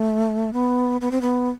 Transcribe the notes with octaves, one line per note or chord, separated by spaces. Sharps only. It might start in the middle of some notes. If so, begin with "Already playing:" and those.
Already playing: A3
B3
B3
C4
B3